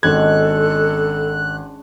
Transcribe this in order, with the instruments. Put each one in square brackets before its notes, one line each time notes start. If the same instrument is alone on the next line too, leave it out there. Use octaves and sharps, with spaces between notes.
[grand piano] G#1 G#6 [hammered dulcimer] G#3 C#4 D4 [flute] A4 [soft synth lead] F#6